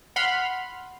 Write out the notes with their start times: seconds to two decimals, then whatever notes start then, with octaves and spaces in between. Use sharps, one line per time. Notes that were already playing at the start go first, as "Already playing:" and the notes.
0.16 F#5 B5 C6 F6